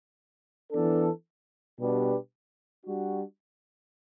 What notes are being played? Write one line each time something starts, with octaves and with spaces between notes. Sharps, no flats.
E3 B3 D4 A4
B2 G3 D4 G4 B4
G3 D4 F#4